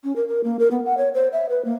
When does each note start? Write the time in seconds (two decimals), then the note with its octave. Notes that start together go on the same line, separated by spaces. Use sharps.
0.04 C#4
0.16 A#4
0.28 A#4
0.44 A#3
0.59 A#4
0.71 B3
0.85 F#5
0.97 C#5
1.14 C5
1.32 E5
1.49 B4
1.65 A#3